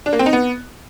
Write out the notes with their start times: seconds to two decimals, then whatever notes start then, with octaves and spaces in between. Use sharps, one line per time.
0.06 D4
0.13 A#3
0.19 C4
0.26 D#4
0.33 B3